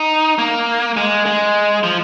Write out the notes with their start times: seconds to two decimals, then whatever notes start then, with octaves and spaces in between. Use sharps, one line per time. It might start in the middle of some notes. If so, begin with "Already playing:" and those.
Already playing: D#4
0.38 A#3
0.97 G#3
1.26 G#3
1.83 F3